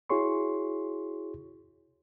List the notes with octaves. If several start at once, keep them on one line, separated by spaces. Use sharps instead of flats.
E4 F#4 G#4 C#5 C6 C#6